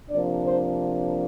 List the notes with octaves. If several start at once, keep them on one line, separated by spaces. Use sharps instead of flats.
C3 F3 A#3 D4 D5
C5